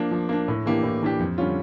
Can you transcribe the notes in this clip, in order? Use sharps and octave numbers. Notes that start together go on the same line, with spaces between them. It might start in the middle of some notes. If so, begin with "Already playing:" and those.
Already playing: F3 A#3 D4
F3
A#3 D4
A2
E3 A#3 D4 G4
A2
E3 A#3 D4 G4
F2
D3 G3 C#4 F4